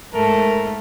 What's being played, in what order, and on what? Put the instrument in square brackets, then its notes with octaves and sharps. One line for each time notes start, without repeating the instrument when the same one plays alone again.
[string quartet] G#2 A3 A4 [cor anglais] A#4